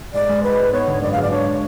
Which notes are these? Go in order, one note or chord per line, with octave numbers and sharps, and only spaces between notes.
G#2 D5
G#3
G#2 B4
G#2
B3 C#5
D3
F#2 D5
G#3 F5
D5
D4 C#5